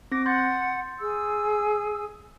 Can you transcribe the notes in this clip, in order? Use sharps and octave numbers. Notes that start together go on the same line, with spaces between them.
C4 D6 A#6
F#5 C6 G6 A6
G#4 E6